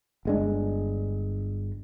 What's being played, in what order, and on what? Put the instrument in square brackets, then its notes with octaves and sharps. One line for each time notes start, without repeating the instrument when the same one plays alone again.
[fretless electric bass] G1 G#3 D4